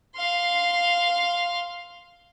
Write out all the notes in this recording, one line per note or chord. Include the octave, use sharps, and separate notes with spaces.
F5 C6